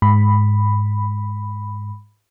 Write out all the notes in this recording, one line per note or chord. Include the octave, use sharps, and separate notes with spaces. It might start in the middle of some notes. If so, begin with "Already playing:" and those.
G#2 B5